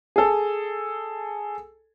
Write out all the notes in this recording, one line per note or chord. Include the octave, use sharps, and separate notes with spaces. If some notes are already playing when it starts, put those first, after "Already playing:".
G#4 A4